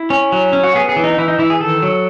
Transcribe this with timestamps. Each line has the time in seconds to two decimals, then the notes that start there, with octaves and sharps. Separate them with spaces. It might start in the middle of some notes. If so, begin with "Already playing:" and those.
Already playing: E4
0.10 C#4
0.32 F#3
0.53 C#4
0.64 F#4
0.75 B3 G#4
0.89 G#4
0.96 E3
1.04 D#4
1.18 E3 E4
1.28 D#4
1.39 E3 E4
1.50 G#4
1.61 D#3 A4
1.82 F#3